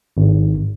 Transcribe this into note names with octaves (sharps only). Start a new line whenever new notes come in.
G#1